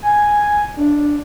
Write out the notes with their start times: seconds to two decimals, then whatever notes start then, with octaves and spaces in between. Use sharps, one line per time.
0.02 G#5
0.77 D4